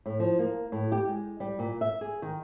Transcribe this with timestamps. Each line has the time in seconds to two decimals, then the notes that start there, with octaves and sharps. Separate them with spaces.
0.06 A2
0.20 F3
0.39 A#3
0.72 A2
0.92 G4
1.08 G#3
1.40 G3
1.59 A#2
1.81 E5
2.01 G#4
2.22 D#3